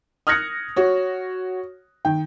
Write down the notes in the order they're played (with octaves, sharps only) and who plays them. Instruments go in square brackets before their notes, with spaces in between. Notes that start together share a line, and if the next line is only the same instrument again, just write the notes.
[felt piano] D#6 F6 F#6 G#6 A#6 C#7
F#4 C#5
D#3 G5